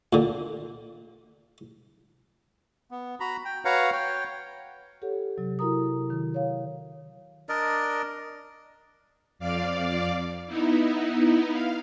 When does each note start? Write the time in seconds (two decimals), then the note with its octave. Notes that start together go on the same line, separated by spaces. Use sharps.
0.13 A#2 D3
2.91 B3
3.20 F#4 A#5 B5
3.45 G5
3.65 F#4 B4 C#5 F5 F#5 A#5
3.92 C#5 G5
5.02 G4 A4 C#5 F#5
5.38 C3 F#3
5.59 E4 F#4 A#4 A#5 D#6
6.10 D#3
6.34 C#5 F5
7.49 D4 A#4 D5 D#5
9.39 F2 D5 F5 D6
10.47 B3 D#4 E4
11.51 F5